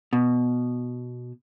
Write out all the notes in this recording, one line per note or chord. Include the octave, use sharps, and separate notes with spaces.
B2